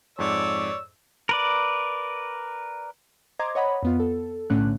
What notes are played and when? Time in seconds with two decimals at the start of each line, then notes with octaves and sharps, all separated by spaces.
0.19 F2 G#2 C#5 D5 E6
1.29 A#4 B4 D5
3.39 C5 D#5 A#5 C6 D6 G#6
3.55 C#5 D#5 F#5 B5
3.83 F2 B3 F4
4.00 A4
4.50 B1 A2 D3 A3 C#4 F#6